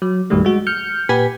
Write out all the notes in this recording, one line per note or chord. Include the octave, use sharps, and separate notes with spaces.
F#3
A#1 F#2 D#3 G3 A3
G#3 F#4
F6 G6 C#7
A#2 G4 B4 G#5 G#6 B6